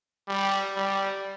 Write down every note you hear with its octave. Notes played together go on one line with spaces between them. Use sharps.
G3
G3